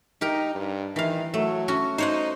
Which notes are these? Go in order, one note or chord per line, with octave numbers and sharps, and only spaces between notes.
D#4 G4 A#4
G2
D#3 E3 F5
F#3 A3
C#4 F#4
D#4 C5 C#5 F#5